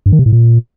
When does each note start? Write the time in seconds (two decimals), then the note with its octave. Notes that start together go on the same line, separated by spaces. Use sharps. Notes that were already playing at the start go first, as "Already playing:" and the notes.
0.06 G2
0.12 D#3
0.19 C3
0.26 A2
0.32 A#2